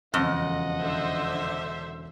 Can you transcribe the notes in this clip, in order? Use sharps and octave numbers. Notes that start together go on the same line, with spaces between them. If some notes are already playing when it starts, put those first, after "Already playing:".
E1 F2 C#3 D#5 F#5 A#6
D3 C5 E5